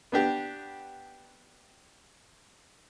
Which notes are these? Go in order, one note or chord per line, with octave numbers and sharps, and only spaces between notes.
B3 D4 G4